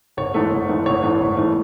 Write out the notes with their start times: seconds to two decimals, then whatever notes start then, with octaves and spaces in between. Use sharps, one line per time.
0.17 G#1 C#5
0.34 G#2 E3 A3
0.52 G#1
0.69 G#2 E3 A3
0.86 G#1 C#5
1.03 G#2 E3 A3
1.21 G#1
1.37 G#2 E3 A3